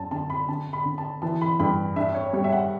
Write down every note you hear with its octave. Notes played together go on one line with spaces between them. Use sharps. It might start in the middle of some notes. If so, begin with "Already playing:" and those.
Already playing: F#2 A5
D3 A5
B5
D3 A5
B5
D3
A5
E3 A5
B5
G2 B5
D4 E5
C#5
G3 C#5
E5
F#5